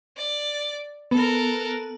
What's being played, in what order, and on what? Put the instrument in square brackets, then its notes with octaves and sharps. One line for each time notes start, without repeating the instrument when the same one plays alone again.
[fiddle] D5
[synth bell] B3 [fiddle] A4 A#4